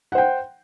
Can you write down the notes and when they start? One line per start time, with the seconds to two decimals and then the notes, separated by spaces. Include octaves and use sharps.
0.12 F#5
0.15 C5
0.18 G5